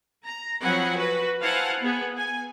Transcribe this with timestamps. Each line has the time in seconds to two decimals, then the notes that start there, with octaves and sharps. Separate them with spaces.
0.24 A#5
0.61 F3 F#3 C4 F#5 G#5 B5
0.95 F#4 B4
1.41 E4 C5 F5 F#5 G#5 A5
1.80 B3 G#4
2.17 G#5